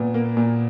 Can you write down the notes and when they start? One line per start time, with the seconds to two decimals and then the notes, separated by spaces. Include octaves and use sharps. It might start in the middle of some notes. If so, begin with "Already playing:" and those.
Already playing: A#2 B3
0.14 A#3
0.37 A#2